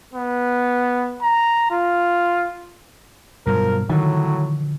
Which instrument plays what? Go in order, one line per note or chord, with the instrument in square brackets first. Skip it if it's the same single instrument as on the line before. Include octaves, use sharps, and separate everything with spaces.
[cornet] B3
A#5
F4
[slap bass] G2 B2 F#3 [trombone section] F3 A#4
[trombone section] A2 F#3 [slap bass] D3 F3 [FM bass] D#3